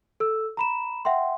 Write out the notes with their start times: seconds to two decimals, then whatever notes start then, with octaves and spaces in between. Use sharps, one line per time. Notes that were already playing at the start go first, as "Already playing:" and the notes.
0.20 A4 E6
0.57 A#5 B5 E7
1.05 E5 F#5 G5 C6